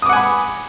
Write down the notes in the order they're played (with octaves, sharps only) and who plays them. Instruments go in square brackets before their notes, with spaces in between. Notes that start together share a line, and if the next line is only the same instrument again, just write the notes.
[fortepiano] D#6
D6
F#5
G#5
B5